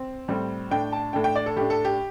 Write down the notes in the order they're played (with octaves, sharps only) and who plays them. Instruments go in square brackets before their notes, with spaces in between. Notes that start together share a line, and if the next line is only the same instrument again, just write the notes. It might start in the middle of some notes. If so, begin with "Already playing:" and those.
Already playing: [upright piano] C4
A2 G3 C4
A2 A3 D4 G5
A5
A2 A3 D4 G5
G5
D5
A4
A2 A3 D4 G4
A4
G4